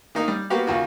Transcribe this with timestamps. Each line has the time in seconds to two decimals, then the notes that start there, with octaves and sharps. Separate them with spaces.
0.15 D#3 A#3 D#4
0.28 G3
0.50 A#3 B3 F#4 G4 F5
0.67 D#2 C#3 F4 F#4